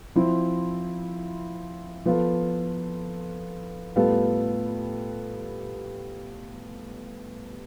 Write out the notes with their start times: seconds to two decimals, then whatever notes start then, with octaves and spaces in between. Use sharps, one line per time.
0.16 F3 C4 E4
2.05 F3 B3 F4 A4
3.96 A2 G3 B3 F4 A4